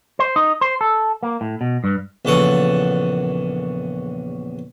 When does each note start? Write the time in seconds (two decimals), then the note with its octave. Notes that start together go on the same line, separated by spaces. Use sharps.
0.19 C5
0.36 D#4
0.61 C5
0.81 A4
1.23 A#3
1.41 A2
1.61 B2
1.84 G2
2.25 A#1 E2 C#3 A4 F#5 C#6